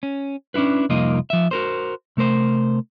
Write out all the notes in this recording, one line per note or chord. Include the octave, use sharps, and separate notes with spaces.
C#4
C#4 D4 E4 F4 B4
C2 F2 A#3 D#4 F4 D#5
F3 E5
F#4 A#4 C5
C3 A3 A#4 C5